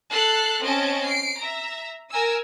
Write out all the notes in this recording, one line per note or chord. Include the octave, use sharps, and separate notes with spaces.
A4 F#6 C7
C4 C#4 D#5 A5 D7
C7 D7
E5 A#5
A#4 G#5 E6